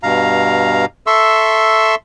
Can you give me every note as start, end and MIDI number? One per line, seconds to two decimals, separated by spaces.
0.03 0.85 43
0.03 0.85 47
0.03 0.85 77
0.03 0.85 82
1.07 1.95 69
1.07 1.95 76
1.07 1.95 84
1.07 1.95 85
1.07 1.95 88